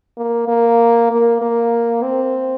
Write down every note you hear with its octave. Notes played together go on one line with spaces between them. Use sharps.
A#3
A#3
A#3
A#3
C4